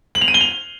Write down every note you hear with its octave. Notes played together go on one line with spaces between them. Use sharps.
F#7
F7
D#7
G7
F7